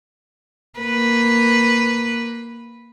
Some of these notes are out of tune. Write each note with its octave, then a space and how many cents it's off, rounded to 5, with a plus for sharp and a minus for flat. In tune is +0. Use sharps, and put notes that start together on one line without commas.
A#3 +0 B4 +0